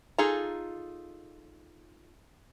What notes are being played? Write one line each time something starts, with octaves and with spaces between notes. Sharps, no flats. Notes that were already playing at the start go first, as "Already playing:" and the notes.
D#4 F4 G#4 A4 A#5